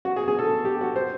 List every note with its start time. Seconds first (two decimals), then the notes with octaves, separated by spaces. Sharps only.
0.05 F#4
0.16 G#4
0.28 G#4
0.39 A4
0.65 G4
0.81 F#4
0.96 C5